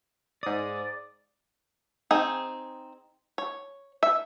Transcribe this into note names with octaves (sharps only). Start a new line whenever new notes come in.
G#2 D5 D#6
C4 D#4 G#4
C#5
E5